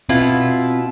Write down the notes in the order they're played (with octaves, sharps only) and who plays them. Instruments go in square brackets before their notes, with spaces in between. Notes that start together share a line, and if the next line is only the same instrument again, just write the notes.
[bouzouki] B2 E4 F4 [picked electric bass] C4